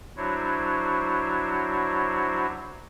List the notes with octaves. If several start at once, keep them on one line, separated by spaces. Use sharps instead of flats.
F#3 D4 E4 F#4 C5 C#5